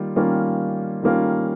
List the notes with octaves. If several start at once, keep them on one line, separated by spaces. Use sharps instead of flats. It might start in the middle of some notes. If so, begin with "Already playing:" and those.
Already playing: D#3 G3 A#3 F4
D#3 G3 A#3 C#4 F4
D#3 G3 A#3 C#4 F4